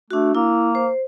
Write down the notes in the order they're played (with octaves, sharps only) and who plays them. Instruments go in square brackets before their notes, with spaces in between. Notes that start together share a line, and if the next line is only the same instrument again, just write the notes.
[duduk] A3 [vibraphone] D4 F#4
[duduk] A#3 [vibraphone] E4
[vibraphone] C5